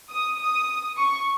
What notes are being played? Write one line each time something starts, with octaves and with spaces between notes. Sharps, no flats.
D#6
D#6
C#6